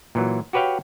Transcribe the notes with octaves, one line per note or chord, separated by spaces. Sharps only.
A#2 E3 F#3
F#4 G4 B4 C#5 F5 G5